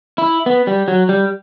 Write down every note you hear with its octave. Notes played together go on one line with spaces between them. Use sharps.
E4
B3
G3
F#3
G3